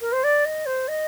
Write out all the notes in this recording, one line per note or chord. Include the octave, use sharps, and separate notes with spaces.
A#4
C5
D5
D#5
C5
D#5